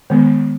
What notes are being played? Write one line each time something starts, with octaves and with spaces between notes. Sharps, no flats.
D#3 G#3 B3